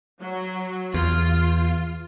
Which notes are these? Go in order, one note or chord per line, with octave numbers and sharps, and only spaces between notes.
F#3
E2 F4